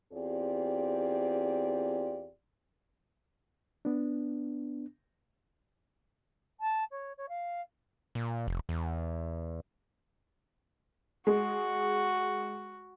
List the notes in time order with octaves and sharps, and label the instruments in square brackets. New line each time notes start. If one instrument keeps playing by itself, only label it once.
[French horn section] E2 C4 F4 G4 G#4 D5
[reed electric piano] B3 D4
[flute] A5
C#5
C#5
F5
[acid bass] A#2
F1
E2
[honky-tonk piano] G#3 [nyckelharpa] F#4